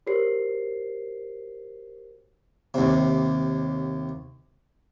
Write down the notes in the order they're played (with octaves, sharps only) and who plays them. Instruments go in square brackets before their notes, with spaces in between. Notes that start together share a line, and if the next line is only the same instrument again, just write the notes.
[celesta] F#4 G4 A#4 C5 C#5 C7
[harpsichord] D#2 C3